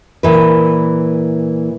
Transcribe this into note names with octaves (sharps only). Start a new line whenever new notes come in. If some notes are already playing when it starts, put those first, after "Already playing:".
A#2 E3 B4